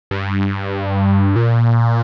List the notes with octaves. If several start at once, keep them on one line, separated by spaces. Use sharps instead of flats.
G2
A#2